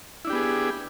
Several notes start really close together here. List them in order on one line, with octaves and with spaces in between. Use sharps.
E4 D4 G4 B3 G#4